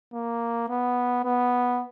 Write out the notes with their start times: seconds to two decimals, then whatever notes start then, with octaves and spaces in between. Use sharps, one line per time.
0.14 A#3
0.69 B3
1.24 B3